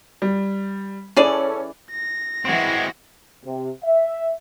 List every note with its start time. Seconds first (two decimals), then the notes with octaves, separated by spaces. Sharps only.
0.22 G3
1.17 E3 C#4 G#4 A4 D5
1.91 A#6
2.45 E3 G#3 C4 F#4
3.44 C3
3.84 E5